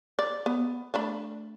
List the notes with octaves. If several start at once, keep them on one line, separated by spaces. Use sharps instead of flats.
D5
B3
A3 D4 B5